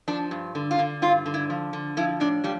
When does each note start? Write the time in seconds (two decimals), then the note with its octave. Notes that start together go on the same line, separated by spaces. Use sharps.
0.08 F3 D4
0.31 G2
0.55 D3
0.71 F4
0.79 D3
1.02 G2 F4
1.26 D3
1.34 E4
1.50 F3
1.73 D3
1.97 F3 E4
2.20 A2 D4
2.44 F3 G3